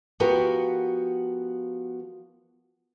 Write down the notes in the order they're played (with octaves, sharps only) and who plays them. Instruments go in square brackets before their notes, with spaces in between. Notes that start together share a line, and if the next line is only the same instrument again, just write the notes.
[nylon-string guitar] F3 B3 F#4 G4 A#4